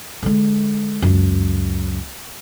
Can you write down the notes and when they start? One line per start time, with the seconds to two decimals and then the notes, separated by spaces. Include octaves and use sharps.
0.23 D3 G#3
1.02 C#2 F#2